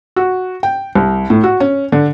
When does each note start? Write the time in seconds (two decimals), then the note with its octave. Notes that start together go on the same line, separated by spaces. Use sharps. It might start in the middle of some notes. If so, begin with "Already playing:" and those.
0.16 F#4
0.63 G5
0.95 C2
1.30 A2
1.44 F#4
1.60 C#4
1.92 D3